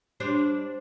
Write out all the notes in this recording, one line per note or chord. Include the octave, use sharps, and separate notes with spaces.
G3 D4 C5